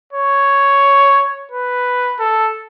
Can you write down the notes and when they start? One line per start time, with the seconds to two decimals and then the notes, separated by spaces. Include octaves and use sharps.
0.13 C#5
1.52 B4
2.20 A4